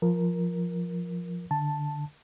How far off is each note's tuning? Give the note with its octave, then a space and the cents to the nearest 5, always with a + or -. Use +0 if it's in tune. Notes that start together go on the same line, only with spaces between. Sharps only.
F3 +0 A#4 +15
D3 +5 A5 +0